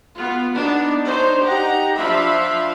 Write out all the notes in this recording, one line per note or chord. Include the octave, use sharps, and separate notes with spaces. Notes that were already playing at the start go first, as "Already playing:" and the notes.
B3 F4
B3 D4 D#4
D4 D#4 C5 C#5
D#4 G4 F#5 A#5
F3 D4 E5 F5 B5 C6